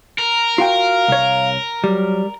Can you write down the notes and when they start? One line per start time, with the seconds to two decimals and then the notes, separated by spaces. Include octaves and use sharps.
0.18 A#4
0.58 F4 F#4 F5 G5
1.08 C2 C#5
1.84 F#3 G3